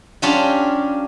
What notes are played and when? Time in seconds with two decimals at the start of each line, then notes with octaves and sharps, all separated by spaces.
0.22 F#3 C#4 D4 F4 G4